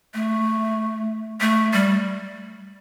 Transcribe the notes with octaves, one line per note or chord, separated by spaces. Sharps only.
A3
A3
G3